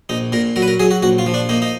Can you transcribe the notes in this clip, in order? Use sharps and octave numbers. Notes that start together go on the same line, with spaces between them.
A#1 D#4
A#2 A#4
F#3 A#4
B4
A#4
F#3 G#4
F#4
A#1 F#4
F4
F3
D4
A#3 D#4
D#4